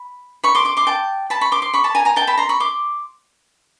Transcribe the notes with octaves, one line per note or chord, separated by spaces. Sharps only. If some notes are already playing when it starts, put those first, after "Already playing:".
Already playing: B5
B5 C#6
C6 D6
C6 D6
C6 D6
G5 A5
A5 B5
B5 C#6
C6 D6
C6 D6
B5 C#6
A5 B5
G#5 A#5
G#5 A#5
G5 A5
A5 B5
A#5 C6
B5 C#6
C6 D6